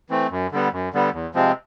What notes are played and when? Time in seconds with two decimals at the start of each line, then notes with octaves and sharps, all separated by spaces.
0.10 E3 A3 C4
0.30 F#2
0.52 D3 G3 B3
0.72 F#2
0.93 D3 G3 B3
1.13 E2
1.34 C3 F3 G#3 C4